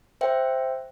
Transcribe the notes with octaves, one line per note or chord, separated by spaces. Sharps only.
C5 E5 G5